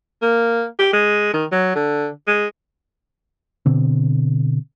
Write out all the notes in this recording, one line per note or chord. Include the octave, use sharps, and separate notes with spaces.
A#3
G4
G#3
D#3
F#3
D3
G#3
B2 D3 C4